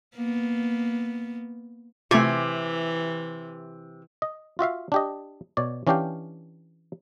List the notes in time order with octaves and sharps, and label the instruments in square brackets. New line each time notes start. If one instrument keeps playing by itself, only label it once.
[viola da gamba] A#3 B3
[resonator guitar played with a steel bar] C3 G#5 [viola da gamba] E3 [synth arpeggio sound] A3 F4
[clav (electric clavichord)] D#5
F4 F#4 E5 F5
D4 G4 D#5
B2 C#5 D5
E3 C#4 D4 G4 F5 G5